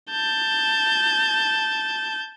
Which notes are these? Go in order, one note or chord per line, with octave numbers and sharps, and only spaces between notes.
A5 G6